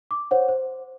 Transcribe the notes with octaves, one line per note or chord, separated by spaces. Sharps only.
D6
C5 C#5 F#5
C5